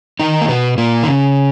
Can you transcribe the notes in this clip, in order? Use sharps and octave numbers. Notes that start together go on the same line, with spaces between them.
D#3 D#4
A#3
B2 B3
A#2 A#3
D#3
C#3